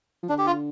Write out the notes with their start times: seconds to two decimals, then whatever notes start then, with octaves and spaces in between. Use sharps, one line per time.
0.23 F3
0.29 D3 D4
0.38 G4
0.47 F4